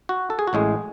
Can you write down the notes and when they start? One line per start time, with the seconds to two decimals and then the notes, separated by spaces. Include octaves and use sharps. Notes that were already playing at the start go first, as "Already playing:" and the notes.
0.09 F#4
0.30 A4
0.39 G#4
0.47 F#4
0.53 A1 A2 G#3 G#4